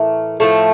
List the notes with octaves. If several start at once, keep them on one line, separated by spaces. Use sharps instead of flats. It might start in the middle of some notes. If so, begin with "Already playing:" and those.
Already playing: A2 E3 A3 A#4
A2 F3 A3